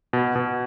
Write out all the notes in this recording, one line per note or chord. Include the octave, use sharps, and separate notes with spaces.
B2
B2